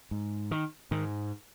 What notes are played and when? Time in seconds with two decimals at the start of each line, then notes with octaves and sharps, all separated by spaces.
0.11 G#2
0.51 D#3
0.91 G#2 D#3